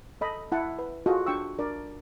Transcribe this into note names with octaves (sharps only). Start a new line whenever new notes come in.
A4 D#5 B5
E4 F#5 A5
B4
F4 F#4 G#4 A4 D#5
D4 G5 C#6 E6
D4 A#4 D5